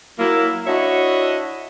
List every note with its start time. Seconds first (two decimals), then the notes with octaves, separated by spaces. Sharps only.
0.19 F#3 A#3 E4
0.67 D4 E4 F#4 C#5 D#5 E5